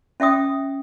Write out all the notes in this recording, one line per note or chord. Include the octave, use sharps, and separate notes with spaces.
C#4 E5 G5 D#6